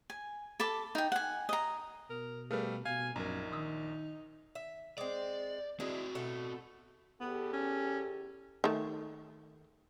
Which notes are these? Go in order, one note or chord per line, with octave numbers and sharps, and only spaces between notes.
G#5
A4 A5 B5 D6
D#4 G5
F#5 G#5
D#5 A#5
B2 A#4
G3 A3 G#4 A#4 B4 F5
B2 F5 G#5
A#1 F#2 D#4 A#4 A#5
D#3 C6 D#6 E6
E5
G#3 C4 D5
G#3 C4 D4 E4 F#4
B2 A3 A4
E2 B3 G4 A4
C#4
D#3 A3